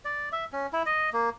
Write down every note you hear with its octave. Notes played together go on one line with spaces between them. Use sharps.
D5
E5
C#4
E4
D#5
A#3